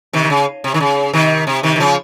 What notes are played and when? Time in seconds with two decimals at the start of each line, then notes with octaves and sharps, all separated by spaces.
0.13 C3 D#3
0.24 D#3
0.30 C#3
0.64 C3
0.74 D#3
0.80 C#3
1.13 C3 D#3
1.47 C3
1.63 C3 D#3
1.76 D#3
1.80 C#3 F3